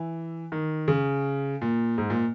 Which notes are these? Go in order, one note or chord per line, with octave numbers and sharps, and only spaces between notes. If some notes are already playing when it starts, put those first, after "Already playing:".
Already playing: E3
D#3
C#3
A#2
G#2
A#2